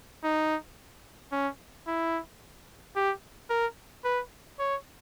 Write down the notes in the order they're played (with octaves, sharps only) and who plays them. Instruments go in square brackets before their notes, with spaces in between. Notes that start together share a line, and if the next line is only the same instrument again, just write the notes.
[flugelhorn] D#4
C#4
E4
G4
A#4
B4
C#5